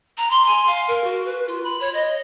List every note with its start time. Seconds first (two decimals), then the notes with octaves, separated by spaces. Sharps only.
0.18 A#5
0.31 C6
0.46 G#5
0.67 F5
0.88 A#4
1.04 F#4
1.25 B4
1.47 F4
1.63 B5
1.80 C#5
1.94 D#5